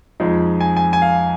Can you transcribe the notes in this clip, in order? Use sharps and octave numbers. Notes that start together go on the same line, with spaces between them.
F2 F3 G#3 D#4
G#5
G#5
G#5
F5